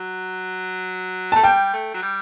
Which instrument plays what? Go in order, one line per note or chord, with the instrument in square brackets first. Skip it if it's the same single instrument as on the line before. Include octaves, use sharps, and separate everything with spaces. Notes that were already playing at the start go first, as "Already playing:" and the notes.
Already playing: [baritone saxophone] F#3
[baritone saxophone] A3 [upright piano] A5
[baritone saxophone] G3 [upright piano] G5
[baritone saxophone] A3
F#3
G3